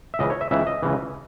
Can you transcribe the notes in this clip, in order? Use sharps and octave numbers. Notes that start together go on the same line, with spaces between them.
E5
C#2 C#3 E3 D#5
C#5
E5
C#2 C#3 E3 E5
D#5
C#2 C#3 E3